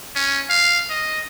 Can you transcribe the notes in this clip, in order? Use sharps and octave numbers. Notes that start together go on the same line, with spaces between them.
C#4
F5
D#5